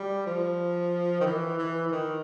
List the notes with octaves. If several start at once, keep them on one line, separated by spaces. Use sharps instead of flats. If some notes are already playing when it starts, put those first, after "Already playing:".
Already playing: G3
F3
D#3
E3
E3
E3
D#3